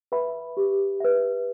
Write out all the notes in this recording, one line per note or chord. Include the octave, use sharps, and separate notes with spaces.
B4 E5 B5
G4
B4 E5